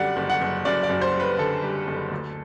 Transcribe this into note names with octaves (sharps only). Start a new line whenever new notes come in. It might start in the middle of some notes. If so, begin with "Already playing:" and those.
Already playing: F#2 D3 G3 D5 F#5
F#1
F#5
F#1
F#2 D5
D5
F#2
C5
G3
B4
D3 A4
G3
F#1
D2